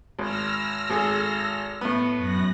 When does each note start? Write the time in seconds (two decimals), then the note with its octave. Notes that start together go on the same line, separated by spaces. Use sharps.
0.19 G#1 E6 F6 A#6
0.90 G#1 G#4 A4
1.81 A2 B3
2.17 F#2 F#6 A#6